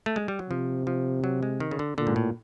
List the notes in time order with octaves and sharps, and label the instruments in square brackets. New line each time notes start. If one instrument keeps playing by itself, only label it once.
[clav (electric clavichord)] A3
G#3
G3
F#3
[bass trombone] C3 [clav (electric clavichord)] F3
[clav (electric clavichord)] F3
F#3
G#3
D#3
C#3
D3
[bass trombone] A#2 [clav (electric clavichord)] D3
[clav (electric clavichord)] G#2
A2